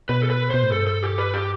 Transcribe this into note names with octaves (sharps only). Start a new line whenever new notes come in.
B2 B4
A4
B4
B2 C5
A2
G2 A4
A4
G4
B4
G4